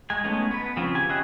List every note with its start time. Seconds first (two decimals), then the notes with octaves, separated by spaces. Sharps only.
0.10 G#3 G#5
0.24 G#3 A3 B3 C#4 D#4
0.51 B3 B4
0.77 C#3 F3 C4
0.95 G4 G#5
1.09 C#4 E4 G#4 D#5 F#6